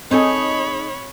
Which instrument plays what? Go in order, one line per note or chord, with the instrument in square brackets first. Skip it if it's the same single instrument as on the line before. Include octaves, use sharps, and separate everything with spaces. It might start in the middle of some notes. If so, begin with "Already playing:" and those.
[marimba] C4 G#5 [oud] D#4 G#4 A4 [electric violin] C#5 B5